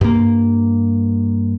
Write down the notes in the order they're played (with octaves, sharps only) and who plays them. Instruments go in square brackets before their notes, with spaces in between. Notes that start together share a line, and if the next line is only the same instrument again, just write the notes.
[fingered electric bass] G2 A#3